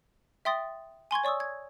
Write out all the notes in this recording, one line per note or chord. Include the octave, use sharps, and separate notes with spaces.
E5 G5 C6 D#6 A6 A#6
G#5 C6 C#6 G#6
C#5 D5 C#6 D#6 E6
G#6